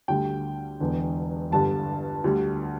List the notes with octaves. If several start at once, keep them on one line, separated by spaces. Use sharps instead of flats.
D2 D3 G3 G5
E1 E2 D3
G1 G2 D3 G3 A5
D2 D3 G3